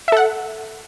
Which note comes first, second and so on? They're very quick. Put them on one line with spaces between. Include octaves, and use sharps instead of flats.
E5 A4 F#5